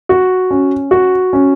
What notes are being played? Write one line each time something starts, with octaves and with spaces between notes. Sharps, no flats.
F#4
C#4
F#4
C#4